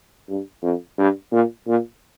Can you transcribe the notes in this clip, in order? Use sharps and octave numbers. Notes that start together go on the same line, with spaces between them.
G2
F2
G2
A#2
A#2